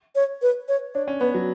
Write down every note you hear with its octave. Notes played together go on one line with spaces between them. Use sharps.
C#5
B4
C#5
D4 C#5
C#4
B3 B4
F#3